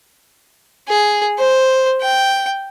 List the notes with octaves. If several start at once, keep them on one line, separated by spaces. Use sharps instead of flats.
G#4
C5
G5